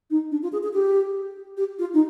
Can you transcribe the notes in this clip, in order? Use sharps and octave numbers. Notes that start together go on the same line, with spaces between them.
D#4
D4
F4
G#4
G#4
G4
G4
F4
D#4